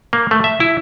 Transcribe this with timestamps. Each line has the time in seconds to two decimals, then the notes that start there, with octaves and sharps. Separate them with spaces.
0.13 A#3
0.31 A3
0.44 E5
0.60 E4